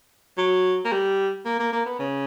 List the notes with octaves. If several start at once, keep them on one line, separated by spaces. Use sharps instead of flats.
F#3
A#3
G3
A#3
A#3
A#3
B3
C#3